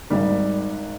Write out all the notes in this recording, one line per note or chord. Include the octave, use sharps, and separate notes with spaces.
G#1 G#2 D#3 G3